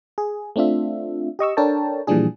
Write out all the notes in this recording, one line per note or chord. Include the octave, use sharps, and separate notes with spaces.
G#4
A3 C4 D4 F4 E5
G4 D#5 C#6 E6
D4 A4 A#4 C#5 G5 A5
A#2 E3 F3 G3 D4 G#4